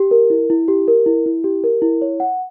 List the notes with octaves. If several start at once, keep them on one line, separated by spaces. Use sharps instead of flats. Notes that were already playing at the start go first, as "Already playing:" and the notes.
Already playing: G4
A#4
E4
E4
G4
A#4
E4
E4
G4
A#4
E4
C#5
F#5